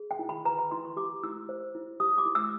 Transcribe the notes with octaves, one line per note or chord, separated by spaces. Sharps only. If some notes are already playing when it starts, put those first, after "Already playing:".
Already playing: G#4
G5
E4
B5
B4 A#5
B5
E4 C6
C#6
G4 D6
E4 E6
C5
E4
G4 D#6
D6
E4
E6